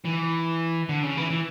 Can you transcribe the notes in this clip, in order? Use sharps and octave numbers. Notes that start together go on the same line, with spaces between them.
E3
D3
C#3
E3
E3